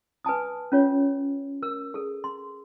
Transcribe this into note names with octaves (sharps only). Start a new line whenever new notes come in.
B4 G#5 A5 D#6
C#4 F4 C#5
A#4 E6
G#4 A4
C6